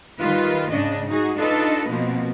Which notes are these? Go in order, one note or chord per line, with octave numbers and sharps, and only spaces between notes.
D#3 G3 F4 B4
G#2 C#3 D4 D#5
D#4 F#4 G#4
D4 D#4 F4 A4 B4 D#5
B2 F3 A#3 C4